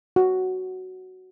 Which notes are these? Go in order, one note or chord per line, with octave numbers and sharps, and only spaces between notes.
F#4